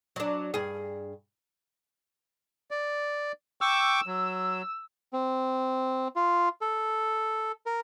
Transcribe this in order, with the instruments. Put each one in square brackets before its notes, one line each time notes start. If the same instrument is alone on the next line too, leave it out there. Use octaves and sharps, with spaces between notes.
[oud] F#3 D4
G2 G#4
[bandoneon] D5
[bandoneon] G5 C#6 D6 [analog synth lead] E6
[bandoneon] F#3
[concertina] C4
F4
A4
A#4